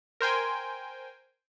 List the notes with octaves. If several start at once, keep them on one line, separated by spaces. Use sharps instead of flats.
A#4 C5 G5 G#5